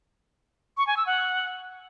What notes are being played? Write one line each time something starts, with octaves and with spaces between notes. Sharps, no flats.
C#6
G#5
E6
F#5